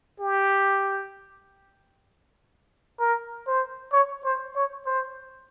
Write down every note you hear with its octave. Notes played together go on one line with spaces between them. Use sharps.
G4
A#4
C5
C#5
C5
C#5
C5